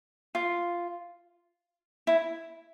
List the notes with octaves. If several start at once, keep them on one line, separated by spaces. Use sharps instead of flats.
F4
E4